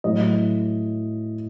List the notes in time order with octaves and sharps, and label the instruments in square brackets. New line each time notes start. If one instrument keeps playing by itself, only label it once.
[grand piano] A2 F#3 A3 D#5